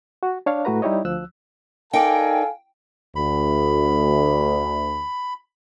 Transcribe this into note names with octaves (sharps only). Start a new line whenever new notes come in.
F#4
D4 C#5 F5
A2 A3 F#4 B4 A#5
G3 D#4 E4 G4 C#5 D#5
D2 F3 E6 F#6
D#4 A4 A#4 D5 F5 G5 G#5
D2 B5